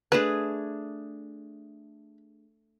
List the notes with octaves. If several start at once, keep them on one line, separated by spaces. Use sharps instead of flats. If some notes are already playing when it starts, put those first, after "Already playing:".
A3 D4 G#4 B4